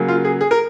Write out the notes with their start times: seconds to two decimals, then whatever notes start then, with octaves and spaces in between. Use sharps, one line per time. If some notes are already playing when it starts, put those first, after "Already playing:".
Already playing: C#3 F#3 A#3
0.08 F4
0.25 G#4
0.41 G#4
0.51 A#4